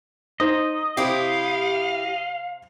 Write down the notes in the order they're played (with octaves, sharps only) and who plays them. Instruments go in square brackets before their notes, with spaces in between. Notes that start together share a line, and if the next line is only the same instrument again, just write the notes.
[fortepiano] D#4 C5 [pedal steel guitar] D#5
[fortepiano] C3 C5 [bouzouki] E4 G4 [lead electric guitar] F5